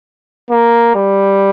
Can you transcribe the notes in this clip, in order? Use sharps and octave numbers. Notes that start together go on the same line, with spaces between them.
A#3
G3